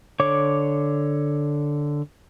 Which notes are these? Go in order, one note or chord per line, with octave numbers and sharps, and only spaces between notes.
D3 C#5 D6